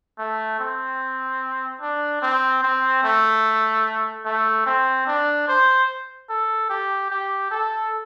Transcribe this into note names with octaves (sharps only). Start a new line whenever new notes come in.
A3
C4
D4
C4
C4
A3
A3
C4
D4
C5
A4
G4
G4
A4